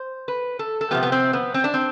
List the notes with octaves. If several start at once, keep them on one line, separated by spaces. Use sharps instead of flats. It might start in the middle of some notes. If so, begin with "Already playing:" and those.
Already playing: C5
B4
A4
A4
C3 F3 B3 G4
B3
C4
B3
C4
D4
C4